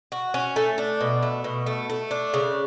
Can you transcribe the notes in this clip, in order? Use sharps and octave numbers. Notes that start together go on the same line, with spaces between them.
F#4
C#4
A3
D4
B2
A3
B2
A3
A3
D4
C#3